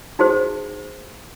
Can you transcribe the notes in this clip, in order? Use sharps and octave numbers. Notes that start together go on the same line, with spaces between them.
D#4 F#4 G#4 C5